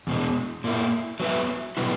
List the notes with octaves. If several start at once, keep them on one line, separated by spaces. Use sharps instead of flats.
E2 B2 G#3
A#2 A#3 E4
F#3 B3 F#4 B4 E5
B2 F#3 B3 E4 B4